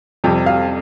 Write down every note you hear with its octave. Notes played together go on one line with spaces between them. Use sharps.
F2 C3 G3 G4
F5